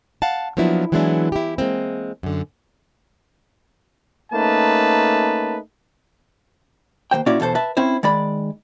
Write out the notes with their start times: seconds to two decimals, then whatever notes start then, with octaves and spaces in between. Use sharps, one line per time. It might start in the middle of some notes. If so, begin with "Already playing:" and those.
0.22 F5 F#5 A5
0.57 F3 F#3 A#3 B3 D4 E4
0.92 E3 F#3 G#3 B3 D4 E4
1.32 E4 G4
1.58 G#3 A#3 C4
2.23 F#2 D3
4.32 A3 A#3 C#4 D#4 B4 A5
7.11 D#2 E3 C5 G5
7.26 A#2 C#4 E4 F#4 D5
7.40 E2 B2 A4 C5
7.55 B4 E5 A5
7.77 C4 C#4 E4 C5
8.03 D#3 G#3 D5 B5